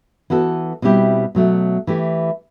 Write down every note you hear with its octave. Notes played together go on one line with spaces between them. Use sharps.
E3 B3 F#4 A4
B2 G3 C4 E4 G4
B2 F#3 A3
E3 A3 E4 G4